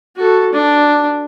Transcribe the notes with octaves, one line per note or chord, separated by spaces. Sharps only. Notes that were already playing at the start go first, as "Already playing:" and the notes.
F#4 A4
D4